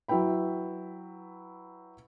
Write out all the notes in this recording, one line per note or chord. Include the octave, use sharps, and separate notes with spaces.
F#3 E4 B4 G5 B5